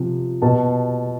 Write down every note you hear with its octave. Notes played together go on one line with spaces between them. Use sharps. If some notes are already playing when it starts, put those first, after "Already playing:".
Already playing: C3 F3
B2 A5